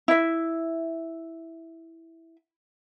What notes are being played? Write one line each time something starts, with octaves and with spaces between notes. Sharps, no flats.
E4 E5